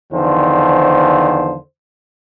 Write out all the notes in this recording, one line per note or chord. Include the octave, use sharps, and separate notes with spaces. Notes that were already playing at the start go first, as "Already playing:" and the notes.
E2 D3 D#3 F3 C5